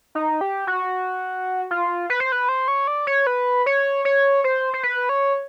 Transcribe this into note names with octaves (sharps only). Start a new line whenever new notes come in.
D#4
G4
F#4
F4
B4
C5
B4
C5
C#5
D5
C#5
B4
C#5
C#5
C5
C5
B4
C#5